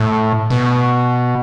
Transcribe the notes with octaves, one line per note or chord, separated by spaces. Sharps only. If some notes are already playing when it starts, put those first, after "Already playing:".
Already playing: A2
B2